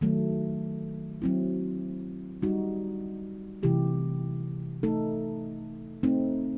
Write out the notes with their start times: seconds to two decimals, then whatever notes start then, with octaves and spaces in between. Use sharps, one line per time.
0.01 D#3 F#3 A3
1.22 F#3 C4 E4
2.42 G3 D#4 F#4
3.63 C3 E3 A3 E4 G4
4.83 A3 D#4 A4
6.03 A3 C4 D#4